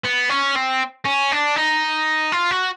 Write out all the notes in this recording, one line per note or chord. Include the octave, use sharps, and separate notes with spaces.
B3
C#4
C4
C#4
D4
D#4
F4
F#4